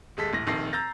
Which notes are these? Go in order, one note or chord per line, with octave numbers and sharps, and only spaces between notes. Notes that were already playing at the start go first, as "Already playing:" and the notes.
D#1 G#3 A4 B6
A#1 A2 A#6
F1 A#1 D#3 A4 A#6 C7
A#5 E6 G6 A6 A#6